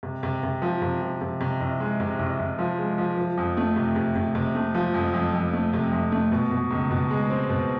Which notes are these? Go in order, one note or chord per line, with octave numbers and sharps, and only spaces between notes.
C3
C3
C3
F3
C3
F3
C3
C3
C2
G#3
C3
C2
C2
F3
G#3
F3
F3
F2
A3
C3
C3
C3
C3
A3
F3
F2
F2
F2
A3
C3
F2
A3
B2
B2
C#2
B2
G#3
C4
B2